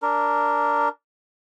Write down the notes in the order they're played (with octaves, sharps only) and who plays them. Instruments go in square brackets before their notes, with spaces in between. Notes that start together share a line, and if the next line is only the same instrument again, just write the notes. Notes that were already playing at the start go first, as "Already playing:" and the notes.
[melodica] D4 A#4